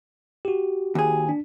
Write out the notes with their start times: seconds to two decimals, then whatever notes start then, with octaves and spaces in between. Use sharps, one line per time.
0.45 F#4 G4
0.95 D#2 G#4
1.29 D4